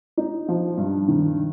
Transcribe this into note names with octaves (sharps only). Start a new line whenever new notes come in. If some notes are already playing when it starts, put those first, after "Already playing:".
D#4
F3
G2
D#3